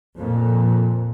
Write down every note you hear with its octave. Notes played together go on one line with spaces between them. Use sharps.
F2 A#2